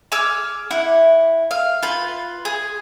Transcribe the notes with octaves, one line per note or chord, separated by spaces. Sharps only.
G#4 D6 E6 F6
E4 F#5
F5
F4 B4
G#4